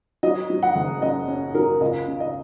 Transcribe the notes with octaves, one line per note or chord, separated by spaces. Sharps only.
F#3 D#5
F#3
F#5
F#1
F#2 D#5
C#4
F#3 A#4
C#2 D#5
C#3
D#5